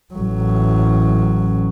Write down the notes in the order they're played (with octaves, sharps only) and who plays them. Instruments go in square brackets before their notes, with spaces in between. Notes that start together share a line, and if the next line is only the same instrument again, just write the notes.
[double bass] A1 F#3